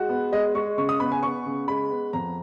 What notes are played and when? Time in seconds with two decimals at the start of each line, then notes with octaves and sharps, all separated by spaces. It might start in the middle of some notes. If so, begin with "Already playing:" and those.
Already playing: G#3 F#4
0.09 B3
0.32 G#3 D#5
0.55 G#3 C#6
0.78 C#3 C#6
0.89 D#6
1.00 B3 B5
1.12 G#5
1.23 B3 C#6
1.46 C#3
1.68 G#3 B5
1.91 B3
2.13 F2 A#5